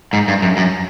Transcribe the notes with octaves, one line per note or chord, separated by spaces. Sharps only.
G#2
G2
F#2
F#2